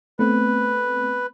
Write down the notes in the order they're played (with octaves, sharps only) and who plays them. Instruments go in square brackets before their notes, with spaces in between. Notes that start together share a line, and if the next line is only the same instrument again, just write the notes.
[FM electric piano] A3 B3 C4 [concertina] B4